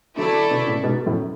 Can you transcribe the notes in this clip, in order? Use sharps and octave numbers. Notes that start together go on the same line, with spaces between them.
D3 F#3 A3 E4 A4 D5
B2 D3
A2 C#3
G#2 B2
F#2 A2